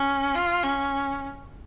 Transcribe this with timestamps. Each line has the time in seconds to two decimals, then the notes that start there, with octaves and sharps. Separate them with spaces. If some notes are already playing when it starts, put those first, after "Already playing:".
Already playing: C#4
0.35 F4
0.63 C#4